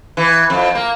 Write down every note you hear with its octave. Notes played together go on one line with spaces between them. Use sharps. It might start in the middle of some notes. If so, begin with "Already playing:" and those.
E3
F2
A#3